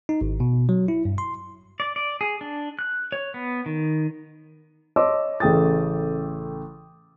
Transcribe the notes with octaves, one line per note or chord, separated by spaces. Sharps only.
D#4
G#1
B2
F#3
E4
G2
C6
D5
D5
G#4
D4
F#6
C#5
B3
D#3
C#5 D#5 A5 C6 D6 E6
A1 C#3 A3 G5 D#6 A6